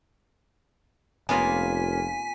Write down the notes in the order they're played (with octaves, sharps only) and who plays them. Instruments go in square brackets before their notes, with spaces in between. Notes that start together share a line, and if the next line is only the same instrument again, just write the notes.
[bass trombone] F1 [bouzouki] A#3 C#4 [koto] B3 F4 A#4 [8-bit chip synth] G#5 B6